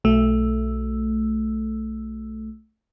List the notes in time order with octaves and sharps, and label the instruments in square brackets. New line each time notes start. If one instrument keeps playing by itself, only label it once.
[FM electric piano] B1 A3